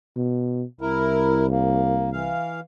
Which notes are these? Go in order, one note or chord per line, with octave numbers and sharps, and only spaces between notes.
B2
C2 E4 A#4
A#3
E3 F5